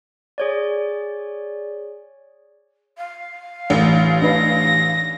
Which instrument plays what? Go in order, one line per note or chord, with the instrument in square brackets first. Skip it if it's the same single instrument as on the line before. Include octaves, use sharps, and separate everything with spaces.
[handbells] G#4 C#5 D5
[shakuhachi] F5
[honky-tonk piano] A1
[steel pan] D4 D#4 B4 [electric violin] A#6